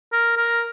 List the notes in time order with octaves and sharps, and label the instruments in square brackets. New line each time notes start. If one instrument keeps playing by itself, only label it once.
[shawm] A#4
A#4